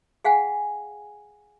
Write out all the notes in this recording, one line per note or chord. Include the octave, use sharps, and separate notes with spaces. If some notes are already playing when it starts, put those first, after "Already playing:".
G#4 F5 F#5 G#5